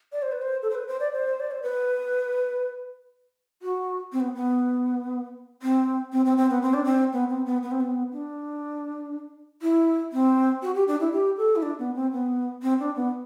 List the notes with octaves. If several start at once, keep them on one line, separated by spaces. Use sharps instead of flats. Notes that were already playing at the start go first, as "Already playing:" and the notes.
D5
C5
B4
C5
A4
C5
B4
C5
D5
C5
D5
C5
B4
F#4
C4
B3
B3
C4
C4
C4
C4
B3
C4
D4
C4
B3
C4
B3
B3
C4
B3
D4
E4
C4
F#4
G4
D4
E4
G4
A4
E4
D4
B3
C4
B3
C4
D4
B3